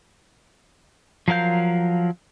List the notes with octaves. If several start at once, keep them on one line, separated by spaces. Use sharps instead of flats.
F3 F#3 A#4 F5 G6